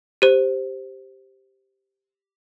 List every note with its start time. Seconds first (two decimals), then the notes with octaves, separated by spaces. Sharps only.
0.22 G4 C5